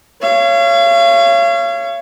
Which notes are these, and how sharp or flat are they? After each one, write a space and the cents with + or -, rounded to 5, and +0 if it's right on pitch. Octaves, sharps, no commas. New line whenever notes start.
C#5 +0 F5 -40